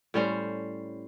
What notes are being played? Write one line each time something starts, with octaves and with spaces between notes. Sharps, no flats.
A2 G3 C#4 C5